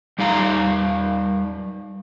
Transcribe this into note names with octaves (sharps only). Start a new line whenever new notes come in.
G3 D#4 F5 A#5